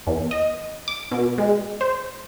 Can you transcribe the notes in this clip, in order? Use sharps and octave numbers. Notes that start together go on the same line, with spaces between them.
E2
D#5
D6
B2
G#3
C5